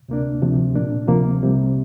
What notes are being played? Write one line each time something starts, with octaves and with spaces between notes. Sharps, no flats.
D2 C3 A#3 D4
D2 C3 F3
A#2 A#3 D4
D2 C3 F3 A#3
C2 C3 G3